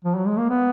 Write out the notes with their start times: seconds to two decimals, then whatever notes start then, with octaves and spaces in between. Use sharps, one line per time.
0.04 F3
0.16 F#3
0.27 G#3
0.37 A#3
0.50 B3